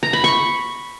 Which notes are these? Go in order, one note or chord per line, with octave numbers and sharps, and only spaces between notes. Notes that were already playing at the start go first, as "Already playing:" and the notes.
A#5
B5
C#6